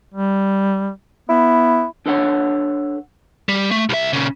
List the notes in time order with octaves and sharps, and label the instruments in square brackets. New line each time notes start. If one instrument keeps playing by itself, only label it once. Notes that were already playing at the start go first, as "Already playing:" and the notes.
[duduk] G3
[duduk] B3 [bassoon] E4
[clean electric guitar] D4 A4 B4 C#5 F#5
[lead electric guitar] G3
A3
C2 E5
A#2 C#3